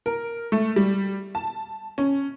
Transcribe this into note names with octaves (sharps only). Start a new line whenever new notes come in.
A#4
A3
G3
A5
C#4